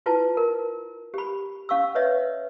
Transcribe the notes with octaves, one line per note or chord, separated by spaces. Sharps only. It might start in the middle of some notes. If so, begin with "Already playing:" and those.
E4 F4 B4 A5
A#4
G4 B5
C#4 F5 C#6 D6 E6
B4 C#5 D#5 E5